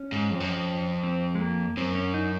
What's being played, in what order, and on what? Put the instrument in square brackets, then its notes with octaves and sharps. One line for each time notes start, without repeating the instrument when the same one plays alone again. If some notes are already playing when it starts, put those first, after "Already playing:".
Already playing: [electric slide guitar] C#4
[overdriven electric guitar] G#2
F2
F#2
F2
[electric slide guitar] C4
G#3
A#3
[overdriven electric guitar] F#2 [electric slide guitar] C4
[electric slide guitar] C#4
D#4